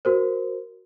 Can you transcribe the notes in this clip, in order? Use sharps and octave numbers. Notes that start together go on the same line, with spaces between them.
F#4 A#4 C5